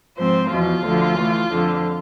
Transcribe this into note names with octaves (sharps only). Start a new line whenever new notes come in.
G#2 F3 C4 C5
E2 B2 F3 F4
D2 D3 F3
A2 E3
F2 D3 F3